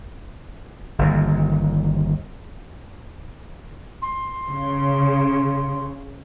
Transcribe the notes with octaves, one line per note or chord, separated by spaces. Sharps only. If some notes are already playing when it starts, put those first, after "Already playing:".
G1 D#2
C6
C#3